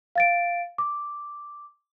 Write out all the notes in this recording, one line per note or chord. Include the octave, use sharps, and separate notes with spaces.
F5 A6 D7
D6